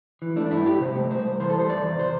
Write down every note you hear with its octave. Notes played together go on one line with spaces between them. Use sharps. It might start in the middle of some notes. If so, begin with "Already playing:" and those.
E3
A3 D4
D4
G2 E4
G2 G4
C3 C5
A3
C2 C5
C2
E3 C5
A4
G3
C5
E2 D5
E2
C3 C5